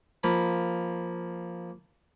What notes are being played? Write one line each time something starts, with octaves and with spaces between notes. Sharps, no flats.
F3 A#3 B5